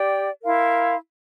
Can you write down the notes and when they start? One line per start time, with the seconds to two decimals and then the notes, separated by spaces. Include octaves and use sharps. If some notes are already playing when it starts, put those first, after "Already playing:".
Already playing: G4 D5 G5
0.43 E4 A#4 F5 C6